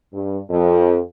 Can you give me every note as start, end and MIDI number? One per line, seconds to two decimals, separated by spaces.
0.13 0.38 43
0.50 0.99 41